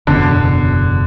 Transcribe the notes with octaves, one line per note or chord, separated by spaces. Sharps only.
F#1 E2 B2 D3